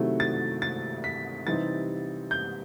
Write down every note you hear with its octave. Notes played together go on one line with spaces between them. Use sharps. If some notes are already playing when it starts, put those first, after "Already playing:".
Already playing: C3 D#3 F#3 A3 E4
A6
A6
B6
C3 E3 G3 C4 D#4 A6
G6